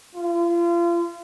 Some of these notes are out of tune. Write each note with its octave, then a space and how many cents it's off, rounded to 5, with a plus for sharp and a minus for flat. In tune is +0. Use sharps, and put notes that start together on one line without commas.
F4 -35